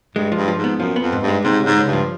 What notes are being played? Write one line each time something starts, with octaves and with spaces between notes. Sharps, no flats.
G2 G#3
G2 F3
F3
G#2
B3
F#2 F3
B3
F2
G#2
G2
G#3
G#2 C3
C#2
G#2
C#2
G2
F3